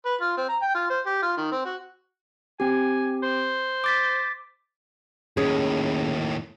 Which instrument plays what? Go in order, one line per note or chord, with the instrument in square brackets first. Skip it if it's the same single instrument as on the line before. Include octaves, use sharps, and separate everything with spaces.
[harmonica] B4
F4
C4
A#5
G5
F4
C5
G4
F4
D#3
C4
F#4
[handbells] C4 G4 [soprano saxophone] G#5
[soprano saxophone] C5
[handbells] D6 A6 B6
[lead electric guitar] D#2 A2 [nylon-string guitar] C#4 G#4 C#5